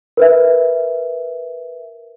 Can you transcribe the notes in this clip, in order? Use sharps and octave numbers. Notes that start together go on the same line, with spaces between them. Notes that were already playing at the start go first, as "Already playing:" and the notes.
A#4 B4 E5